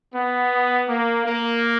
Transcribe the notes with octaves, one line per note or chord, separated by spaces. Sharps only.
B3
A#3
A#3